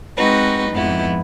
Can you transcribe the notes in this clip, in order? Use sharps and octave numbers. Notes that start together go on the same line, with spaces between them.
G#3 C4 D#4 F#4 B4
F2 G#2 F3 B3 E4